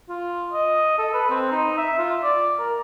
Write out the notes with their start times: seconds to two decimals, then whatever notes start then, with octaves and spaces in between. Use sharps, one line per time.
0.09 F4
0.53 D#5
0.98 A4
1.14 B4
1.30 C4
1.52 D#4
1.78 E5
1.99 F4
2.23 D5
2.59 A#4